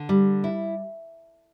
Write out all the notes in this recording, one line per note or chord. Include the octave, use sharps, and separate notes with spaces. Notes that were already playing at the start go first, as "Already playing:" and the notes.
Already playing: D3
G3
E4